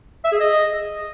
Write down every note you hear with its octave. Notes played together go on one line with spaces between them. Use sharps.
E5
G#4
D#5